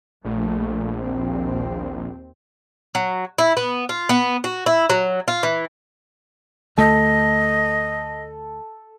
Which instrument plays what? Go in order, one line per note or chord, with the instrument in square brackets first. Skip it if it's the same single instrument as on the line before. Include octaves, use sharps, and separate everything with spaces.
[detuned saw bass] A#1 [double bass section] A3
[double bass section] D#2 C4
[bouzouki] F#3
E4
B3
F4
B3
F#4
E4
F#3
F4
E3
[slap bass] D2 A3 [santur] A4 [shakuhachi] D#5